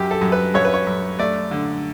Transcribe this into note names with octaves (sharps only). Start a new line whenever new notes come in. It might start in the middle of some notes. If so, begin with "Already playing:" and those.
Already playing: F#2 G4
A4
F#2
B4
F#2 C#5
B4
C#5
F#2
A3 D5
D3